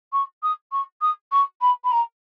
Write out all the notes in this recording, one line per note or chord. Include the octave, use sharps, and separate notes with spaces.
C#6
D#6
C#6
D#6
C#6
B5
B5
A#5